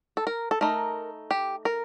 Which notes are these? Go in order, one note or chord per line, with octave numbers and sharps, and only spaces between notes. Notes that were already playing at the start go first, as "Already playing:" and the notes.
A4
A#4
A4
A3 D#4 A#4
G4
A#4